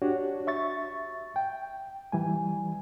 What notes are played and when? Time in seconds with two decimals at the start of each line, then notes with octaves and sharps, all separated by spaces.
0.02 D4 F#4 G4 C#5
0.47 E5 C#6 A6
1.36 G5
2.12 E3 G3 G#5